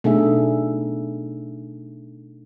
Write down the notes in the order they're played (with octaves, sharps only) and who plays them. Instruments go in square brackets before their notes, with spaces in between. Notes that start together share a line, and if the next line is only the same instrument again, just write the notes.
[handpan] B2 A3 D4 D#4 G#4 E5